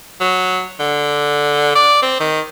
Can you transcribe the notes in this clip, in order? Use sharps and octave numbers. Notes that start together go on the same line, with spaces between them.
F#3
D3
D5
C4
D#3